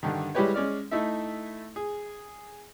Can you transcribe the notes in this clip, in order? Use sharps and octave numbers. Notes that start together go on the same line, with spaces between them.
G2 D3 D#3
G3 G#3 E4 G4 B4 C#5
G#3 C#4 D5 F6
A3 D#4 E4 A4 E5
G#4